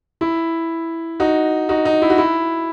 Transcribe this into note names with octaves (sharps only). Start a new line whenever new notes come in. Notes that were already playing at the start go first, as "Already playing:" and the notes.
E4
D#4 F#4
D#4 F#4
D#4
E4
F#4
E4